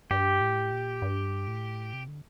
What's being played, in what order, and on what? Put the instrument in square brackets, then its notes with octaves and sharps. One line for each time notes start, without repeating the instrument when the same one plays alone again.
[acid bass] G2 [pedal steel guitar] G4
[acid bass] A2
A#2
G2
A2
C3
D3